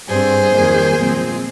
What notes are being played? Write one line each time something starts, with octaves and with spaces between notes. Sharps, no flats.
G2 G3 C4 G#4 C5
F2 D#3 G3 A#3
A#2 F3 G#3 C4